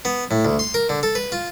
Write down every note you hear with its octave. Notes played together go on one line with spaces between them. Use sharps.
B3
A2
D2
C6
A#4
D3
A4
B4
F4